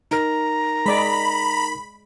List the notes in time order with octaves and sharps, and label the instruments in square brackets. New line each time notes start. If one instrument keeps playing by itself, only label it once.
[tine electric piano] D#4 A#4 [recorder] A#5
[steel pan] G#3 D5 [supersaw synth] B5